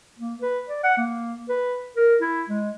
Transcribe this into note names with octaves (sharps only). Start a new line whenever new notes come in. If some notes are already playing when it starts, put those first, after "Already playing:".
A#3
B4
D5
F#5
A#3
B4
A#4
E4
G#3